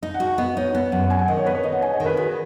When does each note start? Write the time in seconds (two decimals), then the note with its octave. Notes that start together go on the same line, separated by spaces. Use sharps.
0.02 D#4 D#5
0.14 F#5
0.20 F#4
0.27 F#5
0.38 B3 D#5
0.57 D#4 C#5
0.74 B3 F#5
0.92 F#2 F#5
1.03 F#5
1.10 C#4 G#5
1.19 F#5
1.28 D#3 D#5
1.37 C#5
1.46 B3 B4
1.55 C#5
1.63 D#4 D#5
1.72 F#5
1.82 D#4 G#5
1.93 D#5
2.00 D#3
2.06 B4
2.17 F#4 G#4